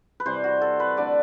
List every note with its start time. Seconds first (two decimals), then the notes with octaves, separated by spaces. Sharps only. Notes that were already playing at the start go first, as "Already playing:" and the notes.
0.20 B4
0.26 C3 E3 G3 C5
0.44 F#4
0.61 A4
0.80 B4
0.97 D3 A3 D5